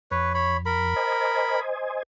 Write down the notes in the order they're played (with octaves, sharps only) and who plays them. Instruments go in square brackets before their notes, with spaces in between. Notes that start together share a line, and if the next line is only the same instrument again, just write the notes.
[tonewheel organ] F2 [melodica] B4 C#5
[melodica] C#5 B5
A#4 B5
[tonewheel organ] C5 D#5 G#5